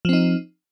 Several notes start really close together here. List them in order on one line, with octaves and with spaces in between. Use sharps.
F3 C4 D#4